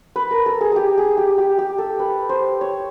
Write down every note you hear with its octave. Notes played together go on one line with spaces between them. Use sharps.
B4
A#4
A4
G#4
G4 G#4
G#4
G4
G4
G4
A4
B4
C5
C#5